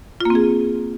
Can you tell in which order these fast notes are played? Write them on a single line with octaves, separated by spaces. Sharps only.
F4 A#3 C4 G#4